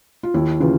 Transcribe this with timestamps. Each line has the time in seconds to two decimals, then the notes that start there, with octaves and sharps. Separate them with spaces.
0.23 F4
0.34 D#2 E4
0.60 C#3 E3 F4